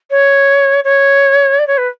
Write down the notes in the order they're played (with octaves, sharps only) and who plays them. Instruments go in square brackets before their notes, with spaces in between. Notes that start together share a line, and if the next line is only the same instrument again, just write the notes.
[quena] C#5
C#5
D5
C#5
B4